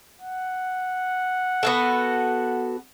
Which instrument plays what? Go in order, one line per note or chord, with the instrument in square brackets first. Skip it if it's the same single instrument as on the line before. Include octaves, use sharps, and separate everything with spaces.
[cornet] F#5
[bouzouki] B3 F#4 A4